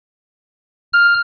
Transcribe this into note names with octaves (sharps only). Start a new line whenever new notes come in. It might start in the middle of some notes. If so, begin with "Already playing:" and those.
F6